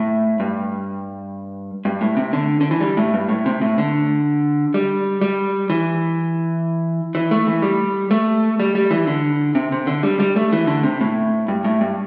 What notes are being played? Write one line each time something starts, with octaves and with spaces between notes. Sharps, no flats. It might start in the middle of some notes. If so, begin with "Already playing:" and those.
Already playing: A2
G2
G2
A2
C3
D3
D3
E3
G3
A2
G2
A2
C3
A2
D3
G3
G3
E3
E3
A3
E3
G3
A3
G3
G3
E3
D3
C3
C3
D3
G3
G3
A3
E3
D3
C3
A2
G2
A2
G2